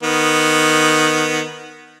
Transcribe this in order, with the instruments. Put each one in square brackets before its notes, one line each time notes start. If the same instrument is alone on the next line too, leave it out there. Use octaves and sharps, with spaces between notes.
[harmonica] D#3 B3